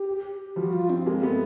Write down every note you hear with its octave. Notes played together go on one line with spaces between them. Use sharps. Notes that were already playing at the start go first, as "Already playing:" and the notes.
Already playing: G4
F3 G3 F#4
F4
C4
G#3 A#3
A3 B3